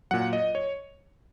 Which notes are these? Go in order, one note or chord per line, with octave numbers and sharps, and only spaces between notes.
A#2 F#3 F#5
D#5
C#5